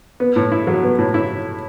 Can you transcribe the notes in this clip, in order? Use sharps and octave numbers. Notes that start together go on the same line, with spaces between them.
B3
A2
E4
F#3
B3
A2
E4